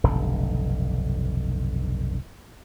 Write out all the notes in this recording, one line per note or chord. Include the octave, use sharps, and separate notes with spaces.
F1 B1 G2 D3